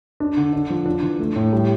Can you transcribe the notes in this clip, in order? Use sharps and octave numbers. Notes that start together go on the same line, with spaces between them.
D4
D3
D4
F3
D4
E3
A3
A2
G3